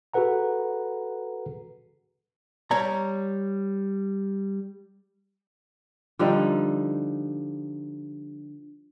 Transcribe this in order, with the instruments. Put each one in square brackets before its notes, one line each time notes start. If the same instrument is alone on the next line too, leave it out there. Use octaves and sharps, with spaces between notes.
[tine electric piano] F#4 G#4 A4 B4 F#5 A#5
[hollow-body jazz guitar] G3 C#5 A#5
[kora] D3 F3 G3 D#4